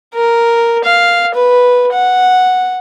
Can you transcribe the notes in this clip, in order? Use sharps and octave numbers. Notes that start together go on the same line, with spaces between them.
A#4
F5
B4
F#5